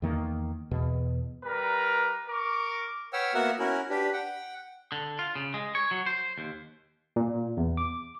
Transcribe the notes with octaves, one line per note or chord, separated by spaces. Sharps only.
E2 D#3 A#3
E2 B2
G3 A#4 B4 A#5
A#4 C#6 D6
B4 C#5 F#5 G5 E6 F6
A#3 B3 F#4 A#4 E5 F#5
C#4 E4 F#4 A#4
D4 G4 B4
F#5 G5
D3
F4
C#3
G#3
C#5
F#3
C5
D#2
A#2
E2
D6